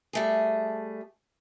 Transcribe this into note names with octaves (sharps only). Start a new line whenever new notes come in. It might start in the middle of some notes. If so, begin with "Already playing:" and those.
G3 A3 G#4